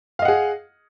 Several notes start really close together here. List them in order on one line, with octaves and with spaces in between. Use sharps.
F5 D#5 F#5 G#4